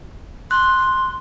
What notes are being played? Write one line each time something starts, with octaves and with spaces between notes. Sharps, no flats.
C6 F#6